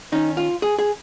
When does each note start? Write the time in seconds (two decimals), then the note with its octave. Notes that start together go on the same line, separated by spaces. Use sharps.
0.12 D#3 C#4 D#4
0.37 F4
0.62 G#4
0.79 G#4